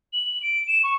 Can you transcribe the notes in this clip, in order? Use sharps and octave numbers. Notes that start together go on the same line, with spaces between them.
F#7
D7
E7
C#6